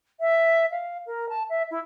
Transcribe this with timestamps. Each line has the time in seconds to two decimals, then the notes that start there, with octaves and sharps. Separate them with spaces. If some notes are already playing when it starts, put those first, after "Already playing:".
0.20 E5
0.71 F5
1.06 A#4
1.29 A5
1.49 E5
1.70 E4